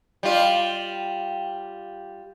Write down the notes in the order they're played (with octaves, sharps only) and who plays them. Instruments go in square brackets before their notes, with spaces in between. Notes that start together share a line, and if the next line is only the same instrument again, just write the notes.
[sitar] G3 F4